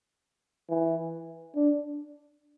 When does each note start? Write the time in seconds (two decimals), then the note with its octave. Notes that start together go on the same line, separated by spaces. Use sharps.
0.69 E3
1.55 D4